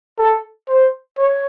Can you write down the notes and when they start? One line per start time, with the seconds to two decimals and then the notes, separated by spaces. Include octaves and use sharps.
0.19 A4
0.68 C5
1.18 C#5